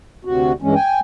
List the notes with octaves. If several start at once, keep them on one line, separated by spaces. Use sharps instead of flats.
D2 C3 F#4
G2 E3 G#3 C#4
G5 G#5